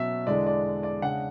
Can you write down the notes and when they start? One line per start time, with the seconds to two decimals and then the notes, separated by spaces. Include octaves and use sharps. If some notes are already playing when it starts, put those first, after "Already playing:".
Already playing: B2 F#3 C#4 E5
0.27 E2 D3 G#3 D4 D5
0.47 D5
0.83 D5
1.02 C#3 G#3 D4 F#5